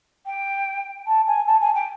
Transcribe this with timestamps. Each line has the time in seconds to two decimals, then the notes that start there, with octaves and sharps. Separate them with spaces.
0.25 G5
1.06 A5
1.26 G#5
1.46 A5
1.60 G#5
1.74 G5